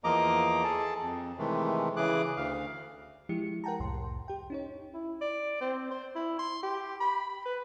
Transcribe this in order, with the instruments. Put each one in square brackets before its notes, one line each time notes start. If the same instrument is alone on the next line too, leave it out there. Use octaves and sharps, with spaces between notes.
[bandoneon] E2 F3 A#3 D#5 A#5 D6
G#4 A4 A5
F2
C3 D#3 E3 G#3 A3
C#3 E3 G#4 D6 F#6
D2 F5
[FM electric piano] F3 G#3 E4 G4 C#7
A#4 F#5 G5 A5 A#5
C2 F2 A2 C6
G4 G5
C#4 D#4 C#5
[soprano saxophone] E4
D5
C4
C5
E4
C6
G4
B5
B5
B4